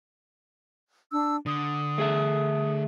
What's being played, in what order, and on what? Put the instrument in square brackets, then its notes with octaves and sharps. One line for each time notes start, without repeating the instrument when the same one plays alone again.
[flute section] D4 E6
[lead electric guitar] D3 [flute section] D#6
[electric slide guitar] A3 G#4 E5